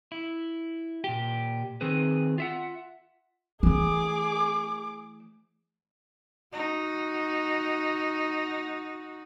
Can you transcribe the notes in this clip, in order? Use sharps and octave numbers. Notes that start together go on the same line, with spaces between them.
E4
A#2 G4
D#3 C4 G#4 B4
F4 E5 F#5
E3 A3 G#4 D6
D#4 F#4